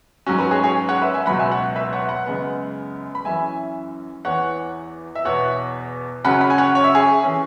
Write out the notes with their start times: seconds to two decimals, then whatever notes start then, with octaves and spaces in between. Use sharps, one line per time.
0.27 G#2 F#3 C#4 F#4
0.39 F#4 B4
0.51 G#4 C#5
0.63 G#4 C#5
0.89 C#5 F#5
1.01 B4 E5
1.14 E5 G#5
1.26 C#2 B2 F#3 B3 F#5 B5
1.39 E5 G#5
1.52 C#5 F#5
1.76 B4 E5
1.93 C#5 F#5
2.09 F#5 B5
2.26 F#2 C#3 G#3 B3
3.15 B5
3.25 F#2 E3 C#4 E5 G#5
4.25 E2 E3 B3 C#5 F#5
5.15 E5
5.25 E2 B2 B3 C#5 F#5
6.24 F#2 C#3 F#3 C#4 F#5 B5
6.41 F#5 B5
6.50 G#5
6.58 C#5 F#5
6.75 C#5
6.84 E5
6.95 G#4 C#5
7.24 E3 C#4